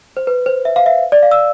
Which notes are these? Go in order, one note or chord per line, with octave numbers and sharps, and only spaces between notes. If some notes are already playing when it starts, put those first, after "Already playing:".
C5
B4
C5
E5
F5
E5
D5
F5
E6